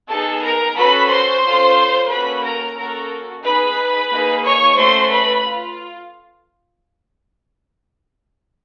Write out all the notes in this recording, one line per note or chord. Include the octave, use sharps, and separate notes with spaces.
B3 D#4 G#4 A4 A5
A#4 A#5
C#4 F#4 A4 B4 B5
C5 C6
C#4 F4 A4
A#3 C#4 F#4 A4 B4 B5
A#4 A#5
A#3 C#4 F#4 A4 A#4 A#5
B3 D#4 G#4 B4 B5
A#3 D#4 G#4
C#5 C#6
A3 C#4 F#4 A4 C5 C6
B4 B5
F4